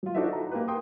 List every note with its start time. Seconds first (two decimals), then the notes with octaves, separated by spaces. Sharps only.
0.03 F#3 F4
0.15 D4 D#4 F#4 A4 C5 E5
0.33 A#5
0.51 A#3 G4 B4
0.68 B4 G5 C6 D#6